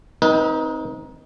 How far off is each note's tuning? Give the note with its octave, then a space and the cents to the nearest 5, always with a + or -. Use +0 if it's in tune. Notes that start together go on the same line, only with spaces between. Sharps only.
C4 +0 D#4 +15 B4 -35